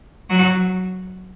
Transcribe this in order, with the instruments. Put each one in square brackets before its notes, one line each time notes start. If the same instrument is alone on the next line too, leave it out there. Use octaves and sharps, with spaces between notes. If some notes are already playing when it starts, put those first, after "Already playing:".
[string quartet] F#3 F#4